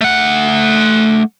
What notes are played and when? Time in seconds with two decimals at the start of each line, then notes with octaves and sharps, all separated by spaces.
0.01 A3 F#5